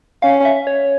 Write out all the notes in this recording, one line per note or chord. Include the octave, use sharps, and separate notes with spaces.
C#4 F5
E5
C#5